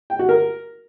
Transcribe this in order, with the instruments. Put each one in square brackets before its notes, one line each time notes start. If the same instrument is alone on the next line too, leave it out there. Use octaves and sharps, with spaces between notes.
[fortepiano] G5
F#4
A#4